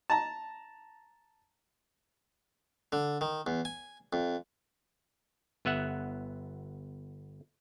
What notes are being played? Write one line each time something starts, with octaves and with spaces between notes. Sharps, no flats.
A5 A#5
D3
D#3
E2
G#5
F2
G1 B3 E5 F#5